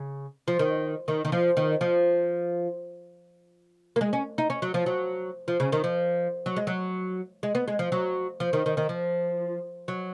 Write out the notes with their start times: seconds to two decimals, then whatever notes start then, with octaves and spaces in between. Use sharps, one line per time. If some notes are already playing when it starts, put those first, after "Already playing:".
Already playing: C#3
0.48 F3
0.59 D#3
1.08 D#3
1.25 D#3
1.32 F3
1.57 D#3
1.81 F3
3.96 A#3
4.01 G#3
4.13 C#4
4.38 D#4
4.50 C#4
4.62 F#3
4.74 F3
4.86 F#3
5.48 F3
5.60 C#3
5.72 D#3
5.84 F3
6.46 F#3
6.56 G#3
6.67 F#3
7.43 G#3
7.55 B3
7.68 G#3
7.79 F3
7.92 F#3
8.40 F3
8.53 D#3
8.66 D#3
8.77 D#3
8.89 F3
9.88 F#3